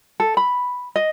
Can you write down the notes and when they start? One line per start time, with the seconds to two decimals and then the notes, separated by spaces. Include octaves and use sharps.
0.20 A4
0.37 B5
0.96 D#5